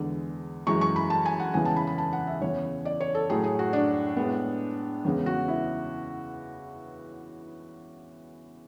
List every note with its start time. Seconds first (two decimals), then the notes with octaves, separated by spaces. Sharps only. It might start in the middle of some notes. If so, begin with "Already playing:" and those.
Already playing: E2 D3 G#3
0.67 F#2 E3 G#3 C#6
0.81 C#6
0.96 B5
1.10 A5
1.26 G#5
1.40 F#5
1.54 E2 C#3 E3 G#3 B3 G#5
1.65 A5
1.76 B5
1.87 B5
1.98 A5
2.13 F#5
2.27 E5
2.41 E2 C#3 E3 C#5
2.85 D5
3.00 C#5
3.15 A4
3.29 A2 F#3 A3 G#4
3.44 G#4
3.59 F#4
3.73 D4
4.17 A2 G#3 B3
5.04 E2 C#3 G#3 B3
5.26 F#4
5.48 E4